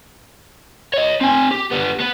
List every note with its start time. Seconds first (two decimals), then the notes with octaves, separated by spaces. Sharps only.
0.94 C#5 D#5
1.21 C4 G#5
1.51 G4
1.71 G3 B3
2.00 B3 B4